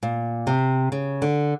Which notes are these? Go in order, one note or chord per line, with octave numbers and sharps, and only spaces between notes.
A#2
C3
C#3
D3